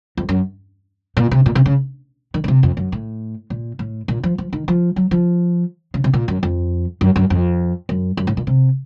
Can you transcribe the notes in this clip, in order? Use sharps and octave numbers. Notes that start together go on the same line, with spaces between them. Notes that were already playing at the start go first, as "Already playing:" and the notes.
F2
F#2
A#2
C3
A#2
C3
C#3
D#3
C#3
C3
F2
F#2
A2
A#2
A2
A#2
F3
F3
D#3
F3
F#3
F3
C#3
C3
A#2
F#2
F2
F#2
F#2
F2
F#2
F#2
A2
A#2
C3